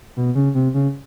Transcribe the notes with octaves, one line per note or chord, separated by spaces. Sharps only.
B2
C#3
C3
C#3